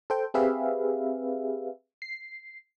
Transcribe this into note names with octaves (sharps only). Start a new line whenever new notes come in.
A4 C5 G5
C4 G4 G#4 B4 E5 F5
C7